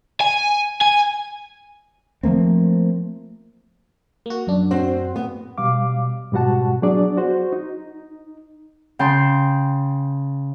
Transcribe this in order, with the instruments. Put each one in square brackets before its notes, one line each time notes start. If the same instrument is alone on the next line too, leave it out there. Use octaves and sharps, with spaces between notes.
[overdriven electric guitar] G#5
G#5
[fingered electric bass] F3 A3 A#3 C4
[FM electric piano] A#3 F#4
F#2 D4
[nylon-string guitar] C4 F#4 C5
B3
[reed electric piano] B2 G3 F5 D6
G#2 B2 G3 F#4 F#5 A5
F#3 B3 D4 G#4 D5
F#4 C5
D#4
[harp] C#3 G5 A5 C6